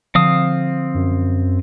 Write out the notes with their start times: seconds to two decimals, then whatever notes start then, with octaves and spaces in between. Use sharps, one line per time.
0.15 D3 F3 C4 F5 D#6
0.94 F#2